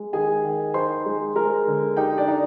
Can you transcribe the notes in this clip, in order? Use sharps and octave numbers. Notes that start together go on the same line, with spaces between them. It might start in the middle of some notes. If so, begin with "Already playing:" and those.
Already playing: G#3
D#3 G#4 G#5
D#3
D#4 C5 C6
G#3
G#3 A#4 A#5
D3
D#4 G4 G5
D4 D5
D#4